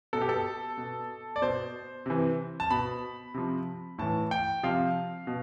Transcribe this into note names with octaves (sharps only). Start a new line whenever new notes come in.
B2 A4
G4
A4
B2
D5
B2 C5
C3 E3
A5
B2 B5
C3 F3
A2 E3 A5
G5
C3 F3 F5
B2